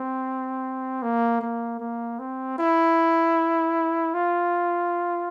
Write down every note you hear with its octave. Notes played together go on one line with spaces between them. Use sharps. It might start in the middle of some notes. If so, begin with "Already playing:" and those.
Already playing: C4
A#3
A#3
A#3
C4
E4
F4